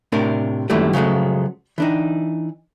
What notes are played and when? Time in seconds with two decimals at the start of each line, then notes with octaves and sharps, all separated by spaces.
0.12 A2 C3 D4 A#4
0.70 F#2 A#2 D#3 E3 G3 A3
0.93 C#3 F3 F#3 G#3 A3
1.78 E3 D4 D#4